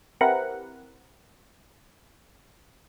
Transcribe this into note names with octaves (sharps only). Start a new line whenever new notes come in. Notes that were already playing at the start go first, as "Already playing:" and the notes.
C4 E4 G4 A#4 B4 F#5